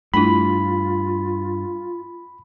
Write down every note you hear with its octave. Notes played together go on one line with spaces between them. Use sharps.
G2 A3 D4 E4 F4 B5